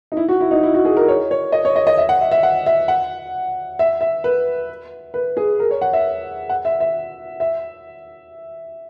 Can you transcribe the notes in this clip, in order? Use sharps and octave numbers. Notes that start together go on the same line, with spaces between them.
D#4
E4
F#4
E4
D#4
E4
F#4
G#4
A#4
C#5
C#5
D#5
C#5
D#5
D#5
E5
F#5
E5
E5
F#5
E5
F#5
E5
E5
B4
B4
G#4
A#4
C#5
F#5
E5
F#5
E5
E5
E5